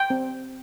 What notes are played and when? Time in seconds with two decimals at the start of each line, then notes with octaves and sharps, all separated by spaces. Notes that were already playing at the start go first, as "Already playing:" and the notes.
Already playing: G5
0.10 C4